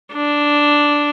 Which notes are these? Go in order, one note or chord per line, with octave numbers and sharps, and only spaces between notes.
D4